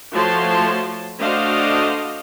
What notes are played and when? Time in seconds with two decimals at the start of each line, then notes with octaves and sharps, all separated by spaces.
0.13 F3 A3 F#4 C#5 A5 C6
1.20 A3 D4 F#4 C5 D#5 F5